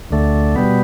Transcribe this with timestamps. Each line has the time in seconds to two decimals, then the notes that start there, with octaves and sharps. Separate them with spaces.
0.11 D2 D3 A3
0.56 B2 G3 B3